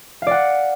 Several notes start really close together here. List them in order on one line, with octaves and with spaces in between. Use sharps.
F5 D5 F#5